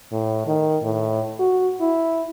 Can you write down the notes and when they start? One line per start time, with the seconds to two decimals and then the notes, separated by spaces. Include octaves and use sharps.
0.12 A2
0.47 D#3
0.83 A2
1.39 F#4
1.81 E4